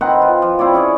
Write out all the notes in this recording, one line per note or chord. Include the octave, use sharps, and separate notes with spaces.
D#3 C4 B4 F#5
F4
F3
C4 E4 C#5 D5
C#4 G#4 C#5 D5